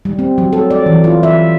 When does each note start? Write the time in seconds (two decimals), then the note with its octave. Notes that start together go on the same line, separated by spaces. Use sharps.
0.05 G3
0.19 C4
0.38 F#3
0.53 A4
0.71 D5
0.86 E3
1.04 F4
1.23 E5